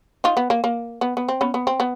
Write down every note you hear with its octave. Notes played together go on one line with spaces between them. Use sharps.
D#4 F4
B3
A#3
A#3
B3
B3
C4
B3 C#4
B3
C4
B3